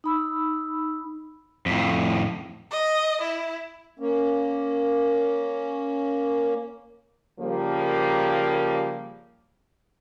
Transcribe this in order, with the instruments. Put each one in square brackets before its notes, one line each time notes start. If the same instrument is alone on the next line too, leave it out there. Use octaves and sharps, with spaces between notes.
[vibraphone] D#4 B5 E6
[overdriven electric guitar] F2 A2
[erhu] D#5
E4
[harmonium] A#3 C#4
[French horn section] C#3 F3 G3 A#3